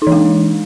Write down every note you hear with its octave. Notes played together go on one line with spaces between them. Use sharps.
E3 G#3 D#4